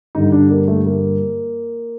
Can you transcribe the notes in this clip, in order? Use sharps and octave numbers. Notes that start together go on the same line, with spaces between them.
G2 D3 D#4
D4
A#3
A3
A#3